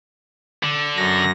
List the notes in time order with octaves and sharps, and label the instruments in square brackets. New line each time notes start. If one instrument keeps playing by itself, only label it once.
[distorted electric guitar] D3
[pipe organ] F#2 A#6